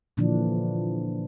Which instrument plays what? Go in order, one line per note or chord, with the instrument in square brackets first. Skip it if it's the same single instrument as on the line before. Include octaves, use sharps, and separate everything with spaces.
[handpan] A#2 D3 E3 F3 D4